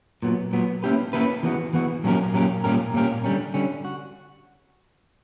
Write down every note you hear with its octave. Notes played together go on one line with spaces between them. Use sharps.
A#2 F#3 B3
A#2 F#3 B3
A#3 C#4 E4 G4 B4
A#3 C#4 E4 G4 B4
E3 B3 F#4
E3 B3 F#4
A#2 F#3 C#4 G4 A#4
A#2 F#3 C#4 G4 A#4
A#2 G3 C#4 G4 A#4
A#2 G3 C#4 G4 A#4
D3 G3 C#4
D3 G3 C#4
F#4